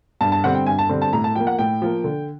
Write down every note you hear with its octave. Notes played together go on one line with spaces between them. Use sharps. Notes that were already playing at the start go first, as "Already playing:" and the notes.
G2 A5
A5
D3 G3 C4 F#5
G5
G2 G#5
A5
D3 G3 C4
A5
A2 A#5
A5
F3 A#3 G5
F#5
A2 G5
F3 A#3
D3